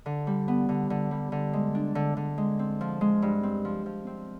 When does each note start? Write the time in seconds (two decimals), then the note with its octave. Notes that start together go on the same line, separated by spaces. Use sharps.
0.06 D3
0.27 G3
0.48 B3
0.69 D3
0.90 D3
1.11 G3
1.32 D3
1.53 G#3
1.75 D4
1.95 D3
2.17 D3
2.38 G#3
2.59 C4
2.81 F3
3.01 G#3
3.22 G2
3.43 C4
3.65 F3
3.86 F3
4.07 C4